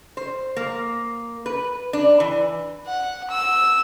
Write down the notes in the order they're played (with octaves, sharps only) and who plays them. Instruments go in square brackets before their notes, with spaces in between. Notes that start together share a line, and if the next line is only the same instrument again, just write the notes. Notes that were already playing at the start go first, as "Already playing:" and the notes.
[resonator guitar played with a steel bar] C5
A#3
B4
D4
E3
[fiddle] F#5
E6